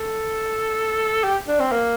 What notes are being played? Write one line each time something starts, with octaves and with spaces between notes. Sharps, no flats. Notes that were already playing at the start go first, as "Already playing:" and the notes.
Already playing: A4
G4
D4
C4
A#3